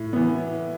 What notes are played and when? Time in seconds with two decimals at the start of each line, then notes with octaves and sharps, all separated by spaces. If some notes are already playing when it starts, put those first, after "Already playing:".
Already playing: A2
0.13 E3 B3